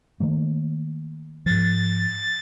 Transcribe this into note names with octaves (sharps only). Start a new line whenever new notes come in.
D#3 A3 A#3
G#2 F3 A6